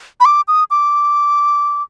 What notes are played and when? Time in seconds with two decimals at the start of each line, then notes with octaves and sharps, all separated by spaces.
0.20 B5
0.25 D6
0.48 D#6
0.71 D6